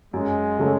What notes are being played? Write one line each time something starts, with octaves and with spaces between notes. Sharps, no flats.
F#2 G#3
C#3 F#3 A3